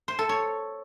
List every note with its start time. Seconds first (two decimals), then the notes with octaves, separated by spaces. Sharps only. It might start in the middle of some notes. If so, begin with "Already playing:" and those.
0.08 C5
0.19 A4
0.29 C#5